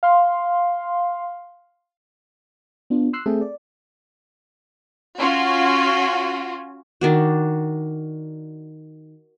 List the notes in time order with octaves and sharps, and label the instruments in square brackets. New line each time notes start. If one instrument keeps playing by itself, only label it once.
[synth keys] F5 C6
[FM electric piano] B3 D4 F4
C6 E6 F#6 C7
A3 C4 G#4 A4 E5 G5
D5
[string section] C#4 F4 F#4
[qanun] D#3 D4 F#4